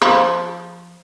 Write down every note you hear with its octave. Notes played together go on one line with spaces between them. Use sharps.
F3 C5 B5